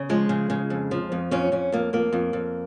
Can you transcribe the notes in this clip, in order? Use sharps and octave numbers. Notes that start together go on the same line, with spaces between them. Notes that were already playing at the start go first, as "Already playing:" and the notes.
Already playing: C#3
F3 G#3
C#3
C#3
F2
F3
F2
F2 C#4
F2 C#4
F2 A#3
F2 A#3
F2
F2